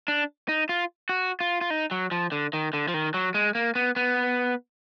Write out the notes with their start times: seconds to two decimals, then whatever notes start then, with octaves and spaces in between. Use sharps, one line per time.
0.08 D4
0.49 D#4
0.69 F4
1.09 F#4
1.40 F4
1.61 F4
1.70 D#4
1.91 F#3
2.11 F3
2.32 D3
2.53 D#3
2.73 D3
2.88 F3
2.94 D#3
3.14 F#3
3.34 G#3
3.55 A#3
3.75 B3
3.96 B3